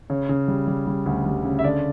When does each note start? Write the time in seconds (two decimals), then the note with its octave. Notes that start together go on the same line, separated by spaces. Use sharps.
0.10 C#3 C#5
0.29 C#3
0.48 G3
0.67 G3
0.87 G3
1.06 D2
1.26 G3
1.45 C#3
1.59 E5
1.64 D3 D5